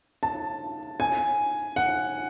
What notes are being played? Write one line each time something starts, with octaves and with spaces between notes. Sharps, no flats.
A5
G#5
F#5